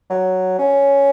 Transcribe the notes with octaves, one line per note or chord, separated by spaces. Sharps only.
F#3
C#4